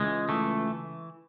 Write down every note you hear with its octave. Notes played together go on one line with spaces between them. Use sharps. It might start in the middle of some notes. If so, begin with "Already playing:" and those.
Already playing: C#2 E3 G#3
E3 A3